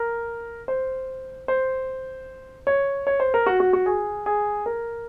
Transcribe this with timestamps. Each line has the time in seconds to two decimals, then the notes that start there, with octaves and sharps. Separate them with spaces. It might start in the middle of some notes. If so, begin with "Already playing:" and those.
Already playing: A#4
0.68 C5
1.48 C5
2.67 C#5
3.07 C#5
3.20 C5
3.34 A#4
3.46 F#4
3.60 F#4
3.73 F#4
3.86 G#4
4.26 G#4
4.66 A#4